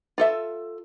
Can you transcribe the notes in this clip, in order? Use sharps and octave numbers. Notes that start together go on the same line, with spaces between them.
F4 A4 E5